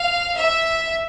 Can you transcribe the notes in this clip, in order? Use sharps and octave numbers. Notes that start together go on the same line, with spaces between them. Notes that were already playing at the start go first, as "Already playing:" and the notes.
Already playing: F5
E5